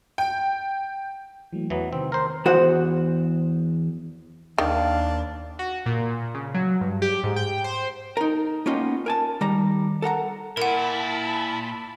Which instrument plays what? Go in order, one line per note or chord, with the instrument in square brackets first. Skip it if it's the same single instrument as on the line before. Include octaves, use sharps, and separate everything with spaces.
[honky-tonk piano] G5
[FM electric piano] E3 F#3 A3
[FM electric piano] E2 [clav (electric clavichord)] E3 F#3 B3
[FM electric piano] C3 D#3 [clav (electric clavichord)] C4
[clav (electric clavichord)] A#4 C5 [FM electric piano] C6
[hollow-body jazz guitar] E2 F#4 C5 F#5
[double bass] D#2 [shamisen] D#3 [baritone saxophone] D4 [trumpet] F5
[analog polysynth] F#4
A#2
C#3
F#3
G2
G4
G#2
G5
C5
[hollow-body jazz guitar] D#4 A#4
A#3 B3 C#4 D#4 F4 G4
A#4 G#5 A5
D#3 G3 A#5
A4 A#4 F#5 A#5
[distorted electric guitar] A#2 [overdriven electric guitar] E4 [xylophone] A#4 F#5 [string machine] A5 B5